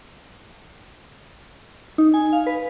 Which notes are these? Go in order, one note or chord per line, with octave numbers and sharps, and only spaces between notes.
D#4
G#5
F5
B4